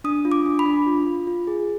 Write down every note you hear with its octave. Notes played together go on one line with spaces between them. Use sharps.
D4 D#6
F4
D6
D4
B5
D4
F4
F4
F4
G#4